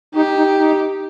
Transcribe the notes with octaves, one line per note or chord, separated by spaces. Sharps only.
D#4 G4
D#4
D#4